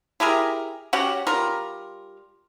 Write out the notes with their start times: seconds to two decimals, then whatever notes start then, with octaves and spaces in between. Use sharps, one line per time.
0.20 E4 G4 G#4 A#4
0.93 C#4 F#4 G4 F#5
1.27 G3 F4 A#4